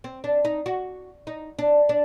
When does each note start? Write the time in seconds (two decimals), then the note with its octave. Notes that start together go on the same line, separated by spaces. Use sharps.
0.04 C4
0.24 D4
0.45 D#4
0.66 F#4
1.27 D#4
1.59 D4
1.89 D4